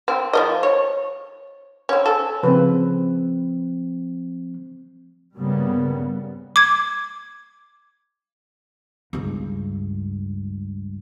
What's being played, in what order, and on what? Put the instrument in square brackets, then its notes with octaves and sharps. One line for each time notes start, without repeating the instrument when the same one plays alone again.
[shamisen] C4
F3 C5 D#5
C#5
C4 C#4
A4
[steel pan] C#3 B4 [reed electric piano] F3 C4
[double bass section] G2 C#3 G3 A#3 B3
[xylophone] D6 G#6
[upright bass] C#2 G2